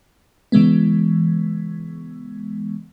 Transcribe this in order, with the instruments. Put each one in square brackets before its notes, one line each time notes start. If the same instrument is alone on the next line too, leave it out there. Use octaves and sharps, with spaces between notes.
[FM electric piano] C#3 E3 G#3 B3